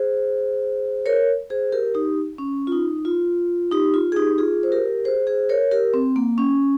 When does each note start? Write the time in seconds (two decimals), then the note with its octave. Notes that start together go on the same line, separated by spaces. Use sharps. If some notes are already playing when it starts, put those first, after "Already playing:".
Already playing: G#4 C5
1.06 A#4 C#5
1.50 G#4 C5
1.72 G4 A#4
1.94 D#4 G4
2.38 C#4
2.67 F4
2.72 D#4
3.05 F4
3.72 D#4 G4
3.94 F4
4.12 G#4
4.16 D#4 G4
4.38 F4 G#4
4.63 C5
4.72 G4 A#4
5.05 G#4 C5
5.27 G#4 C5
5.49 A#4 C#5
5.71 G4 A#4
5.94 C4
6.16 A#3
6.38 C#4